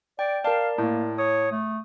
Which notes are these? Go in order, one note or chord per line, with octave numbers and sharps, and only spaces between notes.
D5 G5
A#4 D5 F5 A5
A2 A#3
C#5 D#6
A3